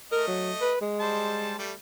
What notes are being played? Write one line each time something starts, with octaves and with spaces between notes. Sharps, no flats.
A3 A#4 D#5
F#3
B4
G#3
G3 C5 A5
G3 A3 G4